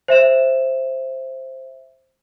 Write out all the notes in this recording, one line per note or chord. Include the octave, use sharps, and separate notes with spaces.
C5 E5 E7